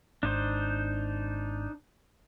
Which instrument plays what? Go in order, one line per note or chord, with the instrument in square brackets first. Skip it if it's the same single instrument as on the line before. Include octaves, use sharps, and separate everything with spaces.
[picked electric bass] G#1 [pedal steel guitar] D4 D#4 C5